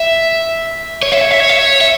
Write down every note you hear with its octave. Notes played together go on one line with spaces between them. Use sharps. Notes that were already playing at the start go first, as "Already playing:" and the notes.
Already playing: E5
C#5
E5
C#5
E5
C#5
E5
C#5
E5